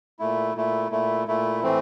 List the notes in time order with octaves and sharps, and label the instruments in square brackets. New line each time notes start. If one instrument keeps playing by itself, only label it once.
[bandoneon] A#2 A3 E4
A#2 A3 E4
A#2 A3 E4
A#2 A3 E4
A2 E3 A3 C4